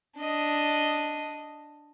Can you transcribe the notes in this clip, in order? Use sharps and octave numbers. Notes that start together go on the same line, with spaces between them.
D4 D#5